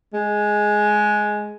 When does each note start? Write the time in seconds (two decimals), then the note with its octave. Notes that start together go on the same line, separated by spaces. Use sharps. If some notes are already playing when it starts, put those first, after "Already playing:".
0.14 G#3